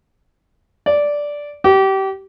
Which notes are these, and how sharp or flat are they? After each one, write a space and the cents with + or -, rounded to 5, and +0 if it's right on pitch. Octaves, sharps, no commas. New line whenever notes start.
D5 -5
G4 -25